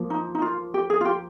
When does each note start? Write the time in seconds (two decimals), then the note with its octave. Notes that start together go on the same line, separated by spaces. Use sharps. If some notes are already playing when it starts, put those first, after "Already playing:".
Already playing: F3 A#3
0.10 D#4
0.35 D#4
0.42 F4
0.74 G4
0.90 G#4
1.01 F4
1.05 G4